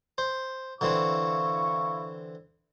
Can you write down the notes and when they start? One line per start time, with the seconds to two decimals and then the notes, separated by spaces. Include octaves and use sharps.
0.18 C5
0.81 D3 E3 C4 E4 F5 C#6